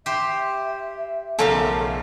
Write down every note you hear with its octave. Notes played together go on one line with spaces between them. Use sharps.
G4 C5 E5
B1 C#3 F3 A3 A4 A#4 F5